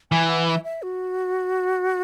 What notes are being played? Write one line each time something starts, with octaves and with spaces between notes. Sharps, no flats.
E3 G#5
F#5
E5
E5
F#4